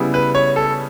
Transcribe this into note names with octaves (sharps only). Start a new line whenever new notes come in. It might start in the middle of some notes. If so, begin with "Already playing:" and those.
Already playing: C#3 G3 B3 E4
B4
C#5
A4